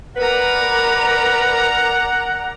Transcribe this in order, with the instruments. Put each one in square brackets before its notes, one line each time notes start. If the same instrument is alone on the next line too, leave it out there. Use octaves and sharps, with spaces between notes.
[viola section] A#4 D5 A#5 [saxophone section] B4 [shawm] F#5